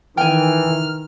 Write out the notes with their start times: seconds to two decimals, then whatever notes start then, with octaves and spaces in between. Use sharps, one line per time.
0.17 D#3 E3 G5 G#5 F6